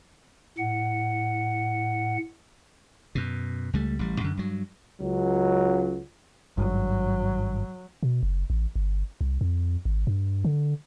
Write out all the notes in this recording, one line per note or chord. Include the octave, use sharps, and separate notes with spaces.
A2 F#5
F#2 B2
C#2 G3 A3
A1 G3
F#2 D3
G2 F#3
C#2 F#3
G#1 G2 F#3
B2
F#1
A1
G1
C2
F2
G#1
G2
D3